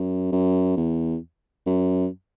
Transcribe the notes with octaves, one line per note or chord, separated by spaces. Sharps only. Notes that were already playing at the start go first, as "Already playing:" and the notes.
Already playing: F#2
F#2
E2
F#2